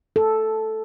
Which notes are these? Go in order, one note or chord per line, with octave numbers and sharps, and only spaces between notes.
A4